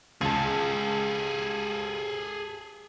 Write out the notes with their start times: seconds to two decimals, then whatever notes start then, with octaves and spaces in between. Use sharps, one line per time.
0.21 C#2 G#4 A4 A5